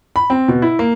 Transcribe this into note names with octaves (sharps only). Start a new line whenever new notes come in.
B5
C4
B2
E4
A#3